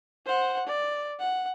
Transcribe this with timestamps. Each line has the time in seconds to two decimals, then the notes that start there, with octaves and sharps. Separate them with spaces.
0.26 C5 F#5
0.67 D5
1.19 F#5